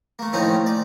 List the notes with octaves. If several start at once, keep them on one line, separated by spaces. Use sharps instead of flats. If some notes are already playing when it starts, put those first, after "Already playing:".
A3 A#3
A2 D#3 F3 C4 C#4 D#4
D5